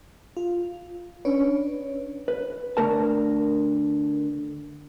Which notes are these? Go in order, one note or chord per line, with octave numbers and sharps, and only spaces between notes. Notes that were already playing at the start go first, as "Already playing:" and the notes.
F4
C#4 D4 B4 C#5
B4
D3 A3 A#4 A5